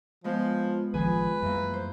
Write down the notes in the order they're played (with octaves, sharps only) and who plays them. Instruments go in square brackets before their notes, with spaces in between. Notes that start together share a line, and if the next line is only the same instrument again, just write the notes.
[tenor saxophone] F3 [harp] G#3 B3 F4
[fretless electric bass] A1 D#3 F3 [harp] G#4 G#5 [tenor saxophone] B4
[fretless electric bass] F#2 G3 [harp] E3 A#3
[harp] C5